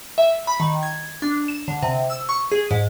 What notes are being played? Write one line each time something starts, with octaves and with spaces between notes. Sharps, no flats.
E5
B5
D#3
G#6
D4
E7
D3
C3
E6
C#6
G#4
G#2